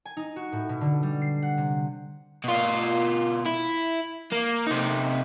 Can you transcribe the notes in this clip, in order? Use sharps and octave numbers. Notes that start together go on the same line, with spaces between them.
G#5
D#4
F#4
A2
B2
D3
G3
C7
F#5
C3
B2 F4
E4
A#3
C3 D#4